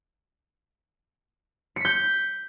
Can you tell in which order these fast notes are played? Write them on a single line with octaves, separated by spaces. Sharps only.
C#7 B6 G6